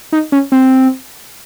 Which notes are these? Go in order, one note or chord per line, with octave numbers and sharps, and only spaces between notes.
D#4
C#4
C4